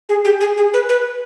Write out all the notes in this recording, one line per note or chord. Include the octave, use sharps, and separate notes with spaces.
G#4
G4
G#4
G#4
B4
B4